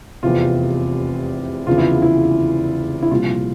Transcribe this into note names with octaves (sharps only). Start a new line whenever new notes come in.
F1 E2 C3 F4
F1 E2 C#3 F4
E4
E4
E4
C2 A#2 F3 F4